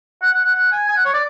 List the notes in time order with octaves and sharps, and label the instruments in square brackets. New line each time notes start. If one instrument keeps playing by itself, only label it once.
[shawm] F#5
F#5
F#5
F#5
G#5
G#5
F#5
C#5
D5